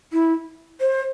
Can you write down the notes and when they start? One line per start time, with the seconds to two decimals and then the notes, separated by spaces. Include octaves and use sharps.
0.13 E4
0.81 C5